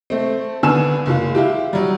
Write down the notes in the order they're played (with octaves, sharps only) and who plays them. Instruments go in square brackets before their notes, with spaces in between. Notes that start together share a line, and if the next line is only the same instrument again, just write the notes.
[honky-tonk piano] A3 C4
G#1 D3 B3 G#5 E6 E7
F#1 G#3 F4
E4 F4 G4
F#3 G3